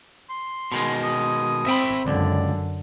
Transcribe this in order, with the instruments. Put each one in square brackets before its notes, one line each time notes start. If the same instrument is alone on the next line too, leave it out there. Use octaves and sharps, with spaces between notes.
[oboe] C6
[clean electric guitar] B2 D#3 G#3
[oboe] D#6
[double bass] C4 [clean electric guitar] E5 G5 B5
[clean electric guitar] C#2 [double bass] F#2 D3 [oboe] D5